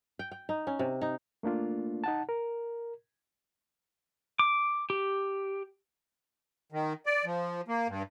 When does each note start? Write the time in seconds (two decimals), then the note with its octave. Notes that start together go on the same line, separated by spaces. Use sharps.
0.19 G5
0.32 G5
0.49 D#4
0.67 C#4
0.79 C3
1.01 D#4
1.43 A3 A#3 D4 F4
2.04 D#4 F#5 A5
2.29 A#4
4.39 D6
4.90 G4
6.72 D#3
7.06 D5
7.25 F3
7.68 A#3
7.88 G2